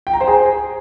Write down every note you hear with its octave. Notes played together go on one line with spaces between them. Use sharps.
G5
A#5
C5
G#4